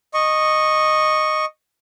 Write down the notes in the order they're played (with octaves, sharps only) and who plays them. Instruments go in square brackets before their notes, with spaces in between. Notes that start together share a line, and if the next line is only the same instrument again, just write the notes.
[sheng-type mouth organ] D#5 C#6